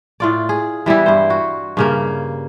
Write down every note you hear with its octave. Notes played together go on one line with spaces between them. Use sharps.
A2 F4 D5
G#4
E3 G3 B3 E4
G2 C5
F#4
G2 C#3 A#3